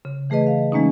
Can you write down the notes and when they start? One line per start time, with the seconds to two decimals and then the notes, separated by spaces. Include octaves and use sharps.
0.05 C#3
0.30 E3 A3 G#4 B4 D#5
0.47 F5
0.72 E3 G#3 A#3 C#4 D#4